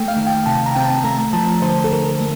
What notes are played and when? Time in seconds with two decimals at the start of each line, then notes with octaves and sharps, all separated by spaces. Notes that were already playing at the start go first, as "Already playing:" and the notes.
Already playing: A3 G5
0.08 F5
0.17 D#3
0.27 G5
0.46 C3 A5
0.66 A#5
0.75 C4 G5
0.85 A5
1.04 A3 A#5
1.33 F3 A5
1.62 D3 C5
1.84 A4
1.92 D3 A#4
2.20 A3